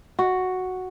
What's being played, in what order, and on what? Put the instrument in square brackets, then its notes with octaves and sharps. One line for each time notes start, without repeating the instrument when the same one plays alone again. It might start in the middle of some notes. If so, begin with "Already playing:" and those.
[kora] F#4